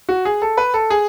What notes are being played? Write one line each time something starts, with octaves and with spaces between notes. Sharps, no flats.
F#4
G#4
A4
B4
A4
G#4